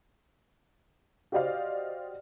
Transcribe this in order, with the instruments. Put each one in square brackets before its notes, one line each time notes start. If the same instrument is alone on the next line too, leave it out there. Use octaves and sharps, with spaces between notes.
[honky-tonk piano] F#4 G4 C5 D5 D#5 F5